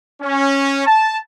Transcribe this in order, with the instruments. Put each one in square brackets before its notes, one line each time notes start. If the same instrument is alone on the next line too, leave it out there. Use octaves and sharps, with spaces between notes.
[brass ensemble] C#4
A5